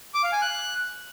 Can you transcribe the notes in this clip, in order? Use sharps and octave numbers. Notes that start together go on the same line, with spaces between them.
D6
F5
G#5
F#6